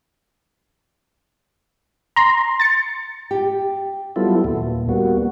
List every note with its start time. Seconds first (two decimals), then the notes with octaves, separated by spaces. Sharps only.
2.16 A#5 C6
2.60 A6 C#7
3.31 G4
4.16 F#3 G3 B3 E4 F4 A4
4.44 D#2 A#2
4.89 G3 A#3 B3 F#4